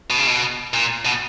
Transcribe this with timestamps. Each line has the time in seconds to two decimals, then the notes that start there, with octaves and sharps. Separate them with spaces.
0.10 B2
0.18 C#3
0.27 B2
0.74 A#2
1.05 B2